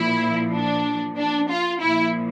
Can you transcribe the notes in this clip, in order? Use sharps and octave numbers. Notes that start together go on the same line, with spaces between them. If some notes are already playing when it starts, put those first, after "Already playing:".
Already playing: A#2 F3 E4
D4
D4
F4
A#2 F3 E4